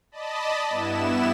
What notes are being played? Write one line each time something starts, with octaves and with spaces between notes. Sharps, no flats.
D5 D#5 A5 B5
G2 B3 E4 E7